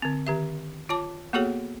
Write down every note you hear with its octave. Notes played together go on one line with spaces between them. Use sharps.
D3 C4
D#3 G4 E5
F4 C#5 A5 D6
A#3 B3 F#4 G#4 A4 C#5